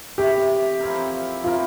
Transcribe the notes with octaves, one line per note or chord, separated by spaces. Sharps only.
C3 E3 A3 G4
F3 C4 E4 A#4
F3 C4 E4 F4 A#4